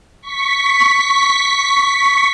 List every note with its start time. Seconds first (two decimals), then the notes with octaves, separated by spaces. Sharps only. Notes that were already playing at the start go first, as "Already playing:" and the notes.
0.21 C#6 B6